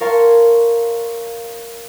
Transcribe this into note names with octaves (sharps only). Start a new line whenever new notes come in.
A#4 C#5 F5 A5 C6